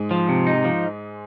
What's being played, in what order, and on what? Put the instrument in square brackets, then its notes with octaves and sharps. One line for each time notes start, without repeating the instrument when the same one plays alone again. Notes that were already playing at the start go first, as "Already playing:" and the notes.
Already playing: [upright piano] G#2 G#3
[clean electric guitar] F3
C3
D#4
F3